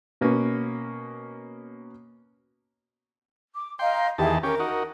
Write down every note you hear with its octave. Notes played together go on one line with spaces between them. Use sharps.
B2 A#3 B3 C#4
D6
D#5 F5 G5 A#5 C6
E2 D#3 G4 G#4 E5 A5
C#4 G4 A#4
D#4 F#4